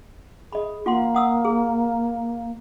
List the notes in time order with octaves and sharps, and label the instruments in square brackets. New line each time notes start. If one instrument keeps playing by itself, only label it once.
[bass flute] G#4 [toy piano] D#5 B5
[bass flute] A#3 [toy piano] F4 F#5 C6
[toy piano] F#5 D#6 E6
G#4